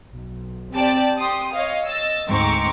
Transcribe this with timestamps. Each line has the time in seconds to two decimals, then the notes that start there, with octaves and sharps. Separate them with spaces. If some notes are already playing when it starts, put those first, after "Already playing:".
0.13 B1
0.74 C4 G4 D5 G5 A5
1.18 G4 C6 D#6
1.53 C#5 D#5 F5
1.86 D#5 E6 A6
2.29 D2 G#2 C4 A#5 C#6 D6